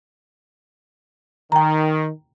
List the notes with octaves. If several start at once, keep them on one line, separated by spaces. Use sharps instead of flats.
D#3 G5 A#5